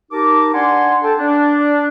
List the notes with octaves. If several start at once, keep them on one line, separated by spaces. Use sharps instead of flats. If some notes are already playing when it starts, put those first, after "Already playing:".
D#4 G4 A#4 A5 D6
D4 D5 F#5 G#5 C6
A4 G5 A5
D4